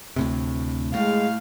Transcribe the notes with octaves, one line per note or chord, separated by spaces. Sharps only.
D2 A2 C3
A2 G#3 F5